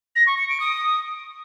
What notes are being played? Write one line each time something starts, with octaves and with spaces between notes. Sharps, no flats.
A#6
C#6
C#7
D7
D#6